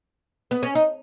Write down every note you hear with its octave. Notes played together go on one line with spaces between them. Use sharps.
B3
C#4
D#4